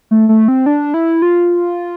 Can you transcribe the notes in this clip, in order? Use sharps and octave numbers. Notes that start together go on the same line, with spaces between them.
A3
A3
C4
D4
E4
F4